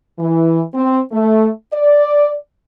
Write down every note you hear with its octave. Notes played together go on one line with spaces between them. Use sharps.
E3
C4
A3
D5